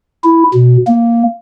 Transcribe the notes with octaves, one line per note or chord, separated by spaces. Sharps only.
E4
B2
A#3